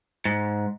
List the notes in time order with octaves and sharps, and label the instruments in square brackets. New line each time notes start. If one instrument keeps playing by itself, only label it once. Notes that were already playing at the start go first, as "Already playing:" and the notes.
[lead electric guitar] G#2